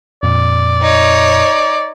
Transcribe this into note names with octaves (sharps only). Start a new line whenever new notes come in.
F2 A#2 D5
D#4 C#5